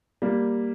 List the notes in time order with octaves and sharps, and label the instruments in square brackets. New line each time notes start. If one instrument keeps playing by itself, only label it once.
[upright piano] G3 A#3